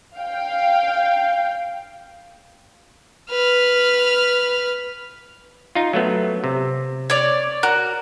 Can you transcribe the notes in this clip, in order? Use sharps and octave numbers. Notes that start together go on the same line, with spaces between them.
F5 G5
B4 F6
D#4 F4
F#3 A3 B3
C3
C#5 D5
F#4 A#4